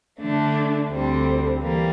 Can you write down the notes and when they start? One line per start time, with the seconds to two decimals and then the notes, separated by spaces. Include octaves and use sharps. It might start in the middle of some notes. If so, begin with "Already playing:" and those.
0.19 D3 A3 D4
0.90 D2 D3 G3 C4
1.61 E3 G3 A#3